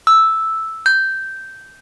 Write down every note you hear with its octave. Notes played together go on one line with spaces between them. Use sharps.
E6
G6